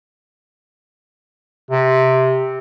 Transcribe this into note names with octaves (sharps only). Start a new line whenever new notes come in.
C3